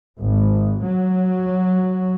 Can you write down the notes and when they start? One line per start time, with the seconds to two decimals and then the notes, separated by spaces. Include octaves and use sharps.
0.21 G#1
0.84 F#3